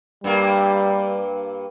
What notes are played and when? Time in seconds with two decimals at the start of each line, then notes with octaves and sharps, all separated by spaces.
0.24 G2 G3 A#3